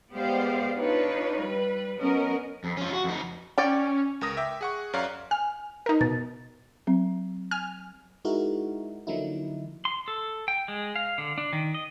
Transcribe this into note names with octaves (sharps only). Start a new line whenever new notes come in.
G#3 B3 G4 C5 D5 F5
D4 D#4 F4 B4 C#5
G3 B4
F#3 B3 C#4 A#4 D#5
F2
C#4 F4
F4 F#4
F2 D#4
C#4 D5 G5
C#2 A#4 D#6 A#6
E5 G5 D6
G#4 F#5 C#6
F#2 C#5 D5 F5 A#5 F#6
G#5 F6
D#4 A#4
B2 A6
F#3 C4
G#5 F6
G#3 D#4 E4 F#4 A#4
D3 F3 F#3 A#3 D#4 E4
C6
A4
G5
G#3
F5
D3
D4
D#3
D#5